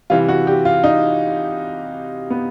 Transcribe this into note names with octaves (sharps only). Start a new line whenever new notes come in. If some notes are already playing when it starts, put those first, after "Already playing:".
C3 E3 G3 F4
F#4
G4
F4
D#4
B3